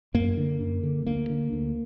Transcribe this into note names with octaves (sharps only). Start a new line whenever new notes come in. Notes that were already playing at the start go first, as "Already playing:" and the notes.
F#2 A#3
D3
F#2
D3
D2 A#3
D3
D2